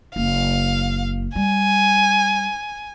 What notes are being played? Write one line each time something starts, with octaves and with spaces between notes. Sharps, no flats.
F#1 F5
G3 G#5